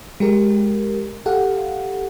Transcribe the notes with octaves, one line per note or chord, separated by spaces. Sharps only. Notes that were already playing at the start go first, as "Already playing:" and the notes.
G#3 G4 A#4
G4 A4 F5 F#5